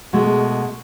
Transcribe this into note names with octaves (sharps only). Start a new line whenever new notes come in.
B2 G#3 A3